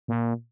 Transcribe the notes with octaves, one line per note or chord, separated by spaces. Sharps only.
A#2